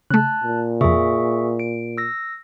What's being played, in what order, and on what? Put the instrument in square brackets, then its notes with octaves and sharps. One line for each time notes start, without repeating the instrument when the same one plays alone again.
[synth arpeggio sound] C#3 A3 [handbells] A5 F#6
[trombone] A#2
[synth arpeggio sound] F2 C3 [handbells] G#4 E5 C#6
[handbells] D7
E6 A#6